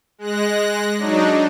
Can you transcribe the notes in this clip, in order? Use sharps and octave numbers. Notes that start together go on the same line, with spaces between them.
G#3 F#6 A#6
F#3 D4 D#4